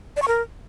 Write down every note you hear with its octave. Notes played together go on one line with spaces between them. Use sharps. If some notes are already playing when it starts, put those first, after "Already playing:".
D5
C#6
A#4